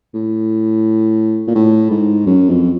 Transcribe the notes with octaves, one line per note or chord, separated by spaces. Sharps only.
A2
A#2
A2
G#2
F#2
F2